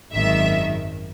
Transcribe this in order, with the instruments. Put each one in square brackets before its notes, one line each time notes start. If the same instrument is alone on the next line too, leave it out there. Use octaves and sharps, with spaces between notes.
[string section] G#1 F#2 D#3 E5